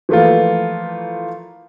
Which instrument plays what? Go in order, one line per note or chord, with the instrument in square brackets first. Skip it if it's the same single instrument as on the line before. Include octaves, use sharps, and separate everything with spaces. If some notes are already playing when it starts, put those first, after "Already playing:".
[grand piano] E3 F3 A3 A#3 F4